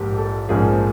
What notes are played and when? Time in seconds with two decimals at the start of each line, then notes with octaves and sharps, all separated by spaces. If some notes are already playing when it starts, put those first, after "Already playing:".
Already playing: A#1 G#2 F3 A#3 G4
0.18 A4
0.49 A#1 G#2 F3 A#3 C#4 G#4